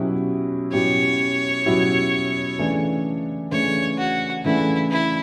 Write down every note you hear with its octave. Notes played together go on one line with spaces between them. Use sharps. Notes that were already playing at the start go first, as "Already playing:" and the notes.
Already playing: B2 F#3 C#4 E4 G4
B2 F#3 C#4 E4 G4 C#5
B2 F#3 C#4 E4 G4
C#3 E3 A3 D4
C#3 E3 A3 D4 C#5
F#4
C#3 E3 A3 D4 E4
E4